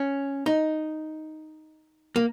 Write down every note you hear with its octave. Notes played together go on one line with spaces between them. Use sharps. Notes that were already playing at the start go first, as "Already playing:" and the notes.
Already playing: C#4
D#4
A#3